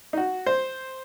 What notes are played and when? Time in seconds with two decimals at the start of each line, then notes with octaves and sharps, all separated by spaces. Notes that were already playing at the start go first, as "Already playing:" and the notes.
0.13 D#4
0.17 F#4
0.46 C5